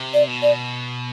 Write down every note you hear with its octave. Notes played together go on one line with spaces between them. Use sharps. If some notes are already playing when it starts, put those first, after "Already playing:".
Already playing: C3
D5
B2
D5